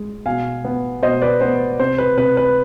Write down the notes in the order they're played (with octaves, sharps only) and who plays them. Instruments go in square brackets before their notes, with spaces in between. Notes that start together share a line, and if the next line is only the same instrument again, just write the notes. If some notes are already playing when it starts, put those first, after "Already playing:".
Already playing: [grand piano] G#3
B2 F5 G#5
B3
B2 C5 D#5
B4 D5
B3 C5
C3 C5
B4
C3 B4
B4